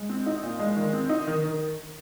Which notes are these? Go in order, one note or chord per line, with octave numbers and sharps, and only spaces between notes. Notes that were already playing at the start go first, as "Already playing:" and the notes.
Already playing: G#3
C4
D#4
A#2
G#3
D#3
C4
D#4
D#3
D#3